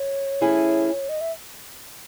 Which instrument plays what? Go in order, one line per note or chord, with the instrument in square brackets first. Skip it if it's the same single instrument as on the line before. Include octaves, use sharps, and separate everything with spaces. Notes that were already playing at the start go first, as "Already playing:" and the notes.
Already playing: [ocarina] C#5
[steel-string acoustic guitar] E3 A3 C#4 E4 G#4
[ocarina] D#5
E5